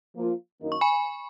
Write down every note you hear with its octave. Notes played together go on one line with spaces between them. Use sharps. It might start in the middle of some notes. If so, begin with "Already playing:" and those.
F3 A#3 F4
F#2 D#3 A#3 D#4 A#4
C#6
G#5 B5